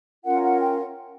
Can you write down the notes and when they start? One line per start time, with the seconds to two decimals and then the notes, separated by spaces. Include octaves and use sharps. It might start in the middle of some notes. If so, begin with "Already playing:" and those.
0.25 C#4 F4 A#4 F#5
0.43 F#5
0.61 G5